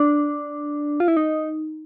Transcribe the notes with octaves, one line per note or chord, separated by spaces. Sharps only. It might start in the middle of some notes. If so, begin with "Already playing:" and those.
Already playing: D4
F4
E4
D#4